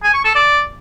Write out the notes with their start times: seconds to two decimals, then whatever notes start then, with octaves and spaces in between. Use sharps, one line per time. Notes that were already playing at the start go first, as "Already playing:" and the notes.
0.04 G#5
0.14 C#6
0.25 A4
0.35 D5